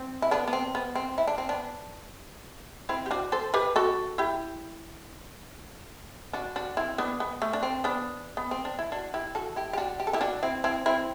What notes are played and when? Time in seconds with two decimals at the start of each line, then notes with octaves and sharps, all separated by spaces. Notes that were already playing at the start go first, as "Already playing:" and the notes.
Already playing: C4
0.22 E4
0.31 B3 D4
0.47 B3
0.53 C4
0.75 B3
0.95 C4
1.18 E4
1.27 D4
1.38 C4
1.49 B3 D4
2.89 C4 E4
3.06 G4
3.11 D4 F#4
3.32 A4 C5
3.54 G4 B4
3.76 F#4 A4
4.18 E4 G4
6.33 D4 F#4
6.56 D4 F#4
6.77 C4 E4
6.98 B3 D4
7.20 B3
7.42 A3
7.53 D4
7.63 C4
7.84 B3 D4
8.37 B3
8.51 C4
8.65 D4
8.79 E4
8.92 D4 F#4
9.14 E4 G4
9.35 F#4 A4
9.56 E4 G4
9.73 G4
9.77 D4 F#4
10.00 G4
10.07 A4
10.13 E4 G4
10.21 D4 F#4
10.43 C4 E4
10.64 C4 E4
10.86 C4 E4